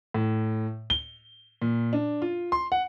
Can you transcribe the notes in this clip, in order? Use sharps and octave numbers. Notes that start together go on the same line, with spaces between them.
A2
G7
A#2
D4
F4
C6
F#5